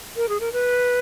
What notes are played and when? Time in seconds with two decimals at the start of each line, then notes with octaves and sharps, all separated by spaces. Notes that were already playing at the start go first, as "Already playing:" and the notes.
0.16 A#4
0.29 G#4
0.40 A#4
0.53 B4